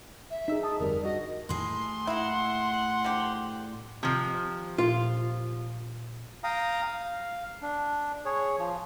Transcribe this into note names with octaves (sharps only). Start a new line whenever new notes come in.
E5
D#4 G#4 E6 B6
A5 D#6
G1 F2 G3 A#4
D4 F#4 D#5
A2 G#4 C6
A#3 E4 F#5
D3 F3 G4
C3 D#3 F3
A#2 F4
F5 G5 A#5 D#6
F5
D4
G#4 C#5
F3